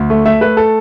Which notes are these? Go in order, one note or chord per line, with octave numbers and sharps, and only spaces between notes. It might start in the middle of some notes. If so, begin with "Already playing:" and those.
Already playing: D2
A3
A3 E5
A3 B4
A4